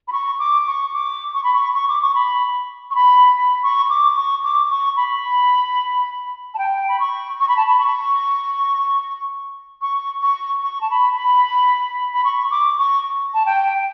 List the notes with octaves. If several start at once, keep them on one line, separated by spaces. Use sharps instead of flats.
B5
C#6
D6
C#6
D6
C#6
B5
C#6
C#6
D6
C#6
B5
C#6
B5
B5
C#6
D6
C#6
D6
C#6
B5
A5
G5
B5
C#6
C#6
B5
A5
B5
C#6
C#6
C#6
C#6
A5
B5
B5
B5
C#6
D6
C#6
A5
G5